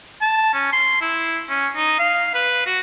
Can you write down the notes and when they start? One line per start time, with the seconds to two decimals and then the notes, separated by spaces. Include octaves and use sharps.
0.22 A5
0.54 C#4
0.73 C6
1.02 E4
1.49 C#4
1.76 D#4
1.99 F5
2.35 B4
2.66 F#4